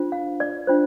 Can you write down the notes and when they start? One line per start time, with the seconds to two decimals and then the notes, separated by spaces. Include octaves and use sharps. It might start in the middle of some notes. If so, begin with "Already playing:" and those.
Already playing: D4 F4 C5
0.12 F5
0.40 D5
0.67 D4 F4 C5